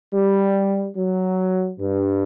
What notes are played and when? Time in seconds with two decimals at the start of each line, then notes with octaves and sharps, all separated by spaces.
0.14 G3
0.97 F#3
1.80 G2